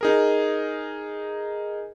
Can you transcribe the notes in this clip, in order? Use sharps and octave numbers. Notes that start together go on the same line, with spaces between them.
D#4 G#4 A#4